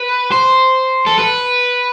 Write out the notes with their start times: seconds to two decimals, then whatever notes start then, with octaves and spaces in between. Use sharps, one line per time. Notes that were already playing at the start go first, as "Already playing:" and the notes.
Already playing: B4
0.32 C5
1.06 A4
1.18 B4